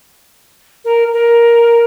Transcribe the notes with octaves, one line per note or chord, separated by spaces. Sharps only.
A#4
A#4